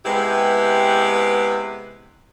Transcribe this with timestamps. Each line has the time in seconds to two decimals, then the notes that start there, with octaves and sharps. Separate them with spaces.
0.05 C3 G#3 B3 E4 G4 B4